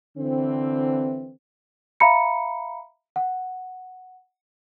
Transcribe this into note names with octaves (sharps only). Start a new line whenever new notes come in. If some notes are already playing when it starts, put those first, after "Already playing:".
D3 E3 C4
E5 F5 A#5 B5 C#7
F#5